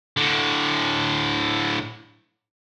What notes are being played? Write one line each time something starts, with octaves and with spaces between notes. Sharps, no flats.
A2 D3